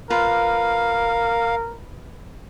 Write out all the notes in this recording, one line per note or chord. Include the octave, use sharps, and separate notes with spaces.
F4 A#4 B4 F5